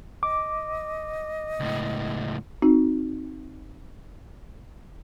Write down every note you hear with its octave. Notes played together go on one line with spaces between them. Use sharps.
D#5 D6
C#2 A2
C4 D#4 F#4